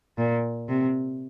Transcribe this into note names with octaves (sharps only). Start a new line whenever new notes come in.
A#2
C3